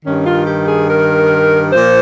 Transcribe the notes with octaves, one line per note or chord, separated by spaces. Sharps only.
G2 D#3 C#4
F4
G4
G#4
A#4
A#2 F3 C5